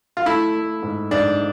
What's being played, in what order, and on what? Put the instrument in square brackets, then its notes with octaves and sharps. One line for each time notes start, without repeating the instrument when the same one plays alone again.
[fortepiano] F4
[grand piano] A3 [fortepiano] E4
[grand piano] A3
G#2
[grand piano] G#2 [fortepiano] D4